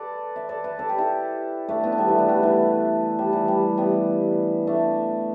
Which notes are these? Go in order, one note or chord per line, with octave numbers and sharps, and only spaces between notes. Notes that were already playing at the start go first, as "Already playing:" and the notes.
Already playing: A4 B4 D5
E5
A4 D5
B4 E5
A4 D5
G4 B4
E4 A4
A3 D4
B3 E4
D4
G3 B3
E3 A3
A3 D4
G3 B3
E3 A3
G3
E3
G3
G3 B3
A3 D4